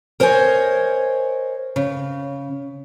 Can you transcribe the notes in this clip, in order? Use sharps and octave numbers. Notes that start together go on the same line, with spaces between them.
A#4 C5 C#5 D#5 G#5
C#3